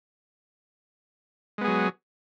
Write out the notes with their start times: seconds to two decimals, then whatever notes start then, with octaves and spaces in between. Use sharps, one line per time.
1.58 G#3
1.61 B3
1.64 G#4
1.68 F#3